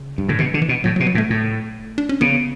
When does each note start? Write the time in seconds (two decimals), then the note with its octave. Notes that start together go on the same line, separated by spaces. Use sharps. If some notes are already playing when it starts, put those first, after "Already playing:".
Already playing: C#3
0.18 G2
0.28 A2 D3
0.39 B2 E3
0.54 D3
0.62 E3
0.69 B2
0.84 A2 F#3
0.96 F#3
1.00 B2
1.07 F#3
1.15 A2
1.18 A3
1.30 A2
1.98 D4
2.09 C#4
2.21 C#3 B3